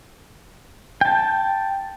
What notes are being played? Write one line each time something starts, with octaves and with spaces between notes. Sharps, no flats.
G5 A5